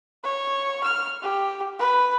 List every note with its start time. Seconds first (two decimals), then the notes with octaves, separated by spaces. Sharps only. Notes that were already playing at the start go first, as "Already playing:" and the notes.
0.24 C#5
0.84 F6
1.22 G4
1.79 B4